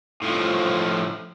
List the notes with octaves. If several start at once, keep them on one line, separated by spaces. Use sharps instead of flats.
A2 F3